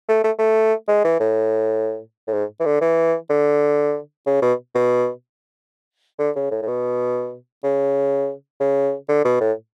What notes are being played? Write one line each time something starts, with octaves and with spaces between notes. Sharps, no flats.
A3
A3
A3
G#3
E3
A2
A2
G#2
E3
D3
E3
D3
C#3
B2
B2
D3
C#3
A2
A2
B2
C#3
C#3
D3
B2
A2